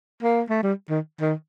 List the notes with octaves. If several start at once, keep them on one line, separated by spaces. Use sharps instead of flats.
A#3
A3
G3
D#3
D#3